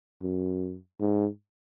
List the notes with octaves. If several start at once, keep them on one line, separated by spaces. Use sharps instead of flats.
F#2
G#2